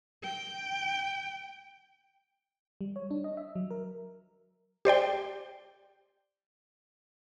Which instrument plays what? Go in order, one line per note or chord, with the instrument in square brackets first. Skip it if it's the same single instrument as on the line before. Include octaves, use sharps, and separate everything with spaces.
[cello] G5
[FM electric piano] G3
C#5
D4
D#5
E5
F#3
A#4
[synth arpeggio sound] G4 C5 D5 G5